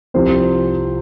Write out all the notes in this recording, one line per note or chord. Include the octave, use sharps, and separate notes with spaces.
C2 C3 F3 C4 C5